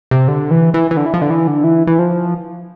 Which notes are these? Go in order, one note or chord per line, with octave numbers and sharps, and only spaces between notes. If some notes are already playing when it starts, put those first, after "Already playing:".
C3
D3
E3
E3
E3
D3
E3
F3
D3
E3
D3
E3
E3
F3